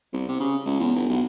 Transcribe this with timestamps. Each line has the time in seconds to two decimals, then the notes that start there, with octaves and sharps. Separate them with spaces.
0.13 C2
0.29 C3
0.40 C#3
0.66 C#2
0.80 E2
0.96 G1
1.09 B1